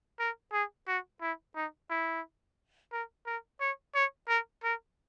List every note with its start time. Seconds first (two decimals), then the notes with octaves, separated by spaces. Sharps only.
0.19 A#4
0.53 G#4
0.88 F#4
1.21 E4
1.56 D#4
1.90 E4
2.93 A#4
3.26 A#4
3.61 C#5
3.95 C#5
4.28 A#4
4.63 A#4